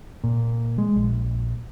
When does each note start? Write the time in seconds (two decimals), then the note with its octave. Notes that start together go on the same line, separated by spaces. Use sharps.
0.24 A#2
0.78 G#3
0.96 A#1